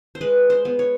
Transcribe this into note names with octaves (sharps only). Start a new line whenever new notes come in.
C5
G#3 B4
C5
B3
C#5